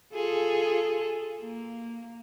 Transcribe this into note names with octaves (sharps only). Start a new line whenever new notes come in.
F4 G#4 A4
A#3